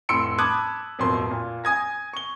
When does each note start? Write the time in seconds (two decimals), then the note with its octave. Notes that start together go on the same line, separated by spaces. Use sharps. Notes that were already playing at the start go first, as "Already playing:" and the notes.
0.09 F1 A2 C6 E6 C#7 D7
0.39 A5 B5 D6 D#6 F#6 G#6
0.99 D1 F2 B2 A#4 C6
1.31 A#2
1.64 G#5 D#6 G#6 A#6
2.13 C#6 G7